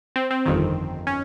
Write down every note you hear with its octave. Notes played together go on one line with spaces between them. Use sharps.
C4
C4
G1 F2 D#3
C#4